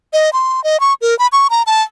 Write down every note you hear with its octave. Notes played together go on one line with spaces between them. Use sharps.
D#5
C6
D#5
C#6
A#4
B5
C#6
A#5
A5